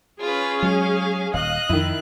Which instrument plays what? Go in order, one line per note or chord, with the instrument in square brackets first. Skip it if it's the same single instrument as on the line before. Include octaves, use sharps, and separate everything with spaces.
[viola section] C#4 G#4 [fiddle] F4 B4
[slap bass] F#3 G#3 [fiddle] F5
[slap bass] D#1 [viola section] D#5 [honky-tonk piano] F5 [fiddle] F#6
[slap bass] F2 [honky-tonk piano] D#3 E4